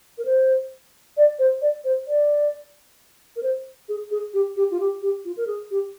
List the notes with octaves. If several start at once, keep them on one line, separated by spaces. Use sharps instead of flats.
A#4
C5
D5
C5
D5
C5
D5
A#4
C5
G#4
G#4
G4
G4
F4
G4
G4
F4
A#4
G#4
G4